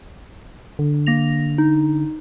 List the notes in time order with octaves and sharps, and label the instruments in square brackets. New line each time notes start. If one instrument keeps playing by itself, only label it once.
[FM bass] D3
[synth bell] A#3 A#6 F7
D#4